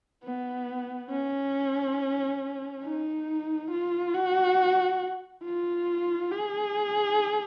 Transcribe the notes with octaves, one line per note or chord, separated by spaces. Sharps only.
B3
C#4
D#4
F4
F#4
F4
G#4